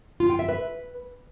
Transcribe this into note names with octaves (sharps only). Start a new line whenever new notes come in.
F4
G5
E5
B4